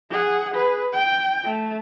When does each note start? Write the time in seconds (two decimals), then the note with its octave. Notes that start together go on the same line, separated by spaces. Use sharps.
0.10 G#4 F#5
0.54 G#4 B4
0.92 G5
1.44 A3